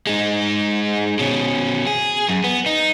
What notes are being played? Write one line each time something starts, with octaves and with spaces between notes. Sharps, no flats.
G#3 D#4
B2 C#4
G#4
F#2
B3
D#4